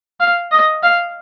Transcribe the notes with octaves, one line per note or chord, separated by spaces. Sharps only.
F5
D#5
F5